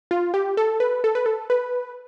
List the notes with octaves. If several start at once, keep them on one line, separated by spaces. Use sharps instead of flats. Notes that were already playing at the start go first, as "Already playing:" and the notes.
F4
G4
A4
B4
A4
B4
A4
B4